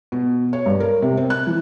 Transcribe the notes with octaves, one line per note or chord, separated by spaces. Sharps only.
B2
C#5
G2
A#4
C3
C4
F#6
E3